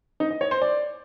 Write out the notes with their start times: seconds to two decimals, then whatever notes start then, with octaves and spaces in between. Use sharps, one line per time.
0.20 D#4
0.30 D#5
0.41 C#5
0.51 C5
0.62 D5